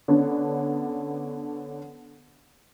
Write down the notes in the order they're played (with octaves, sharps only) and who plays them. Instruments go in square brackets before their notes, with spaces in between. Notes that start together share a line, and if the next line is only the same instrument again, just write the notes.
[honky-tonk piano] D3 B3 C#4 D4